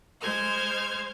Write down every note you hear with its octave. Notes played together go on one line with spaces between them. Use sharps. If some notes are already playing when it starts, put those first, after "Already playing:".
G#3 C5 F6 G#6